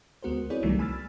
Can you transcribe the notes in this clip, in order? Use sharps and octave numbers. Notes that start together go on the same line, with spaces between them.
D2 G#3 B3 F#4 A#4 C5
C4 E4 G#4 B4 C#5 D5
C2 D#3 F#3 G3 A3 B3
G#5 B5 E6 F6 A6